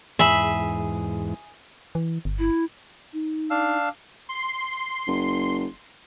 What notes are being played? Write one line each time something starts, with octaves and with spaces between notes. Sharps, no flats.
E2 G#2 G#4 E5 B5
E3
G1
E4
D#4
D4 F5 E6
C6 C7
F#1